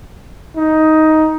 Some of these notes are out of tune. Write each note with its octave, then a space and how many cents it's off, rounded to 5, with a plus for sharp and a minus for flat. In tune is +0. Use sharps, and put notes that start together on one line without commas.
D#4 +10